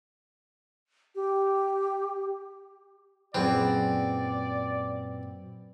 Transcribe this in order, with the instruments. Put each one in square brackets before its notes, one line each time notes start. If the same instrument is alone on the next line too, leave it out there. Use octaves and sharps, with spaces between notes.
[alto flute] G4
[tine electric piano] F#2 A#2 B4 [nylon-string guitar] F#3 G#4 C5 [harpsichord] C4 [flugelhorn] D5